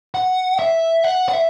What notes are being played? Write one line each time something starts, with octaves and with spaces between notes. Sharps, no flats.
F#5
E5
F#5
F#5
E5